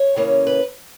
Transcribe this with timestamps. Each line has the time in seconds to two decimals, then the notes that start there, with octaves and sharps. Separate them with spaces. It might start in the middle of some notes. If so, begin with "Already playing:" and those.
Already playing: C#5
0.16 C#3 E3 A#3 C#4
0.47 B4